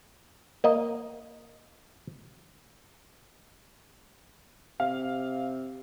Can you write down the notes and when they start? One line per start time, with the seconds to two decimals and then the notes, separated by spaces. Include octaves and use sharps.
0.64 A#3 D#5
4.80 C3 F5